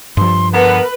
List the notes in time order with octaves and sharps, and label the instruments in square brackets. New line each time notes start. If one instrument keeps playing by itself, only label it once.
[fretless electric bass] G2 F3 [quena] C6
[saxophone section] D3 B3 [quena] A#4 [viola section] B4